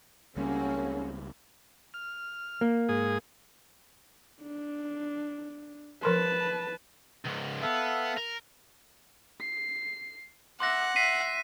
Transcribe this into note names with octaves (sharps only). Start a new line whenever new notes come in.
C#2 C#3 G3 A#3 C4 C#4 F#4
F6
A#3
G#2 G#4 D#6
D4
F3 A#4 B4 A5 C6
C#2 G#2
B3 A4 E5 F5
A#4
C7
E5 F#5 C6 D6 F#6 A#6
E5 B6 C7 D#7